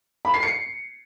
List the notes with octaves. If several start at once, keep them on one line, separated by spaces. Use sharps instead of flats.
B5
C7
C#7